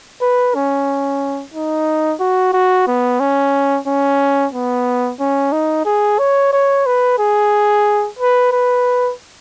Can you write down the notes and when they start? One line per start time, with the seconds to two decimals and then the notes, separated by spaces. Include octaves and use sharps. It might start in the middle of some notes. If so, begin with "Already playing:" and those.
0.22 B4
0.55 C#4
1.54 D#4
2.20 F#4
2.53 F#4
2.88 B3
3.20 C#4
3.87 C#4
4.53 B3
5.20 C#4
5.52 D#4
5.86 G#4
6.19 C#5
6.53 C#5
6.86 B4
7.19 G#4
8.19 B4
8.52 B4